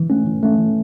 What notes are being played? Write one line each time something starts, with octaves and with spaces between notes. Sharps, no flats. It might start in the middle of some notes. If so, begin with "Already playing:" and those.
Already playing: E3
A3 C#4
E3
A3 C#4
E3